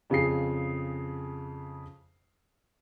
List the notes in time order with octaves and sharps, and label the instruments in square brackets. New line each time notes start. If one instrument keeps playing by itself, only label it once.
[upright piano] F2 C#3 F4 G#4 C7